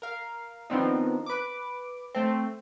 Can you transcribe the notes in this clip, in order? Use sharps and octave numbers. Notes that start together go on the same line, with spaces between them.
A#4 F5
D#3 F3 B3 C4 D4 D#4
B4 D6
A3 C4